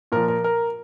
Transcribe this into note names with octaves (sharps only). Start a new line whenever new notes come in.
A#2 F3 A#4
A#4
A#4